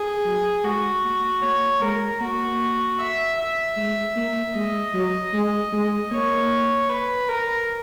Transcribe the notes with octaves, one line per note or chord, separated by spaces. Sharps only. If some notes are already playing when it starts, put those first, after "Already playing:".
Already playing: G#4
F#3
G#3 F#4
A#3
A#3 C#5
G#3 A#4
A#3 F#4
E5
E5
G#3
A#3
G#3 D#5
F#3
G#3
G#3
A#3 C#5
B4
A#4